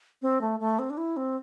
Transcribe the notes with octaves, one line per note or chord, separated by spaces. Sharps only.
C4
A3
A3
C4
D4
E4
C4